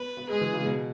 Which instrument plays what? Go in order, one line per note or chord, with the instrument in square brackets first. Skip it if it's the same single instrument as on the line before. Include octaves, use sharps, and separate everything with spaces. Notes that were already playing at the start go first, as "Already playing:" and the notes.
Already playing: [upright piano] B3 [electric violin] B4
[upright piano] B3
[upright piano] G#3 [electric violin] G#4
[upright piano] E3
C#3
B2